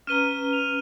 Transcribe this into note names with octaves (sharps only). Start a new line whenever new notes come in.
C#4 B4 A#5 F6 D#7 G7
F7